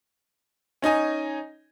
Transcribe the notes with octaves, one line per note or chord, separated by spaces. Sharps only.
C#4 D#4 D#5 G#5